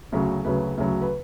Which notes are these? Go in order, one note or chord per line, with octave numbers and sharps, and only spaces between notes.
D2 C#3 F#3
D2 C#3 F#3 B4
D2 C#3 F#3
B4